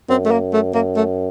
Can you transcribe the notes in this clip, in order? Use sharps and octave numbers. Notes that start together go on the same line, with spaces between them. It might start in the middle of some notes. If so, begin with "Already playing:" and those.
F#2 C4
A3
A#3
A3
F#2 A#3
A3